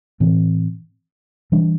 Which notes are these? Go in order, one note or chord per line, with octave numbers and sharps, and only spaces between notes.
A2 E3 C4
E3 G3 D4